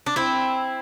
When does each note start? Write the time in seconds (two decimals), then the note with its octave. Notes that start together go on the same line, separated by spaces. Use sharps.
0.06 D4
0.16 C4 E4